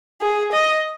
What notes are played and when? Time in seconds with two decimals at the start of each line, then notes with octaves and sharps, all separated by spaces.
0.21 G#4
0.52 D#5